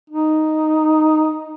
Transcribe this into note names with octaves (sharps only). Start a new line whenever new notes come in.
D#4